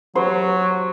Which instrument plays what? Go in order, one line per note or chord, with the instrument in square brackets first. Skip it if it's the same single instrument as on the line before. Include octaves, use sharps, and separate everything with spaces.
[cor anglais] F#3 [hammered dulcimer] C5